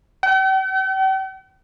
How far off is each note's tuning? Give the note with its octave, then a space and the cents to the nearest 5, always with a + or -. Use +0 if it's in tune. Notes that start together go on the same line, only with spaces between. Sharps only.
G5 -45